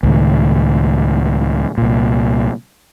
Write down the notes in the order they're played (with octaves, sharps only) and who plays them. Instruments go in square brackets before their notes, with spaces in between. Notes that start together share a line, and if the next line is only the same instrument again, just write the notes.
[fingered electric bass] C#2 A2 D#3
C2 A#2